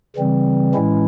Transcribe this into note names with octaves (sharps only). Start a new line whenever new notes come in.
C#3 E3 G3 C4
A2 E3 G#3 C#4 E4